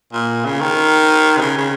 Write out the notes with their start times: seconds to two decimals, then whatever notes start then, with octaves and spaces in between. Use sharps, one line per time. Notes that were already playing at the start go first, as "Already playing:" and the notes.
0.13 A#2
0.45 C#3
0.61 D#3
1.37 C3
1.41 C#3
1.58 C#3